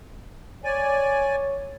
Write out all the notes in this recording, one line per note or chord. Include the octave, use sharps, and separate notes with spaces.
C#5 D5 G#5